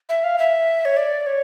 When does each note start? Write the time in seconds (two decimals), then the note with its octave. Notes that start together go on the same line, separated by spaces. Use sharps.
0.09 E5
0.24 F5
0.38 E5
0.85 C#5
0.97 D5
1.26 C#5